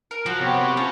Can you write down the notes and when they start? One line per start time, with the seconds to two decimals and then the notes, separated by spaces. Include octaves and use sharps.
0.11 A#4
0.26 F3 F#4
0.40 C3 B3 C4 G4 C#5
0.77 C#4 F4 A5